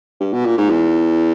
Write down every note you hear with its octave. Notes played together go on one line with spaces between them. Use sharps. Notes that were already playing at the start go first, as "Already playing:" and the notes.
G2
B2
A#2
G#2
E2